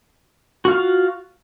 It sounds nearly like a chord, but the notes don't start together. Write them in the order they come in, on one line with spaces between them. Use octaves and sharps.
F#4 F4 F5